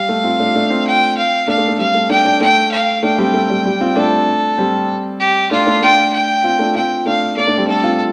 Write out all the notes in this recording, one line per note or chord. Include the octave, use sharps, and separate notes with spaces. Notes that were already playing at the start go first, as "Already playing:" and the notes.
Already playing: G3 F5
A3
C4 F4
A3 D4
A3 D4
C4 F4
G5
F5
A3 D4 F5
A3
A3
G3 C4 F5
A3
A3 D4 G5
A3 D4
A3 G5
F5
A3 D4 G5
G3 C4
A3
G3
G3
C4 F4
A3 D4 A4
G3 C4
G4
A3 D4 F4
A3 D4
A3 D4 G5
G5
C4 F4
A3 D4
C4 F4 G5
A3 D4 F5
A3 D5
A3 D4
G3 C4
A3 D4 A4
C4 F4